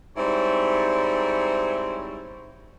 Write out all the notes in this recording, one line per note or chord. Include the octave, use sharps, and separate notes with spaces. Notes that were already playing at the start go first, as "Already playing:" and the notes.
G#2 G3 C4 E4 C#5